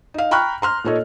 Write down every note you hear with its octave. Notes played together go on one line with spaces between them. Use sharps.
D#4 F5
G5 A#5 B5 C#6 F6 F#6
A#5 C6 F6
A#2 D#4 A4 C#5 D#5